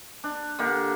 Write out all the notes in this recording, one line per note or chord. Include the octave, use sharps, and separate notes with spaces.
D4
D3 A#3 G4